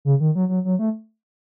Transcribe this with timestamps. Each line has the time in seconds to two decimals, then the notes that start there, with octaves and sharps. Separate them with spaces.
0.05 C#3
0.20 D#3
0.35 F#3
0.49 F#3
0.65 F#3
0.79 A3